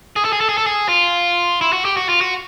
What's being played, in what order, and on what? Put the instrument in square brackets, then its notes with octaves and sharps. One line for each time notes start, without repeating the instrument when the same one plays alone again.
[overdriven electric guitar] G#4
A4
G#4
A4
G#4
A4
G#4
F4
E4
F#4
G4
F#4
F4
F#4